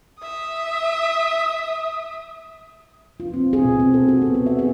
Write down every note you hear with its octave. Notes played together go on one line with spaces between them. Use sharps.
E5 D#6
F4
C4
G#4
B2
C4
A4
F#4
B3
B3
E5
G#4